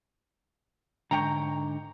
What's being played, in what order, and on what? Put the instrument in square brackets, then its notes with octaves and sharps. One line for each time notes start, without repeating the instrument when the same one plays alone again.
[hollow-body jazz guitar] G#2 D3 [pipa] C#5 G5 A#5